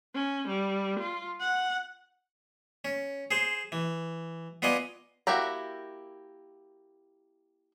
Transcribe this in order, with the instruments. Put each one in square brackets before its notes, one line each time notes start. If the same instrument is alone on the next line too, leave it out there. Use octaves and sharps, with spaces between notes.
[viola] C#4
G3
F4
F#5
[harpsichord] C#4
G#4 C5
E3
B3 F4 D5 D#5 G#5
[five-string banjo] A#3 E4 F#4 G4 A#5